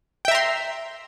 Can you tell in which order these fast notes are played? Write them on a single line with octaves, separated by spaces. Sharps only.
G5 E5 A#5 C6